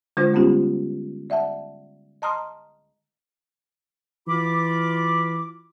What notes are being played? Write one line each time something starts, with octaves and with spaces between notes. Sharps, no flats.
D3 G#3 D4 F4 C5
G3 G#3 B3 C#4 F4 G4
D5 E5 F#5 A5
D#5 A5 A#5 C6 D#6 F6
E3 F4 B5 D6